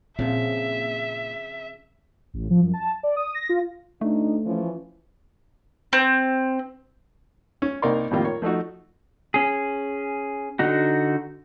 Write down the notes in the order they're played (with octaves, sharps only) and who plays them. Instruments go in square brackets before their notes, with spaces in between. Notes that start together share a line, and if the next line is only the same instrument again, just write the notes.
[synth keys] A#2 [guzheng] C#3 F3 F#3 [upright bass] C4 [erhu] E5
[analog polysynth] A1
F3
F#2
A5
D5
D#6
A#6
F4
[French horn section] D2 D4 D#4 [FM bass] A3
[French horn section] E3 F3 C#4
[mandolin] C4
[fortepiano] C#4
C2 A#3 D#4 A#4 D5 C6
F2 A2 D#3 G3 A#3 F4
A#4 C#5
F3 A3 D#4 F#4
[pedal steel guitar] C#4 G#4
D3 D#4 F#4